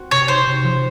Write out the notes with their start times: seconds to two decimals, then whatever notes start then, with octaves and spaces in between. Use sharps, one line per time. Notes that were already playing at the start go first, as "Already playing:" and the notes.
Already playing: C4 F#4
0.11 C3 C#5
0.28 D#4 C5
0.46 C3
0.64 F3